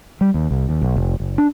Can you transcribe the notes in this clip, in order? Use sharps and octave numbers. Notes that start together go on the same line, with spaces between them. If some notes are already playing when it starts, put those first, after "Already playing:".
G3
D#2
C2
D#2
B1
F1
F#1
D4